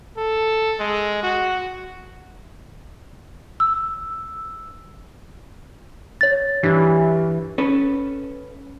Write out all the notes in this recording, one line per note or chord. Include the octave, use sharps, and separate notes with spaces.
A4
G#3
F#4
E6
C#5 A6
G2 E3
C#4 A4 B4